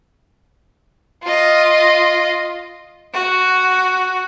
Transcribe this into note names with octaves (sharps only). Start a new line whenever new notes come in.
F4 D#5
F#4